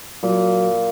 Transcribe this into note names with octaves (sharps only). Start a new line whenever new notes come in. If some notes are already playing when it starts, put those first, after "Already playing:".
A#2 F#3